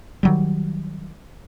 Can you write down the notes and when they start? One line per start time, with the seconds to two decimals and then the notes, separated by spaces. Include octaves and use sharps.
0.23 D#3 F#3 G3